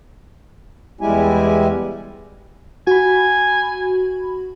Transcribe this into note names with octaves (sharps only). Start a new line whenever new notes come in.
E2 G3 G#3 E4 G4 G#5
F#4 G#5 B5